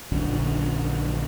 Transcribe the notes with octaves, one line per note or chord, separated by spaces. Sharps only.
A#1 F#2 D3 C#4